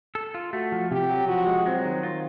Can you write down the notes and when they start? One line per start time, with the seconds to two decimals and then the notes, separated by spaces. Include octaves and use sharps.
0.15 A4
0.34 F4
0.53 A3 F#4
0.72 F3
0.91 C3 G4
1.09 F#3
1.28 F3 F#4
1.47 G#3
1.66 F#3 C4
1.85 D#3
2.03 F4